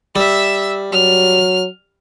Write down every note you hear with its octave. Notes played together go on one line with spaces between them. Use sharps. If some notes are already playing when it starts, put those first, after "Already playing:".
G3 E5 E6
F#3 F6